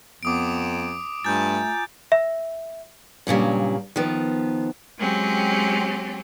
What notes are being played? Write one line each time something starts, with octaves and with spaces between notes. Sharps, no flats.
F2 B3 D6 D#6 D7
G2 A3 F4 G#5 A#5 G6 A6
E5
G2 A#2 C#3 F#3 G3
D#3 F3 B3
F#3 G#3 C4 C#4 G4